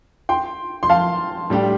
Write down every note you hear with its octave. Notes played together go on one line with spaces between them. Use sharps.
G5 C6
C6
F5 A5
A2 G3 D4 G4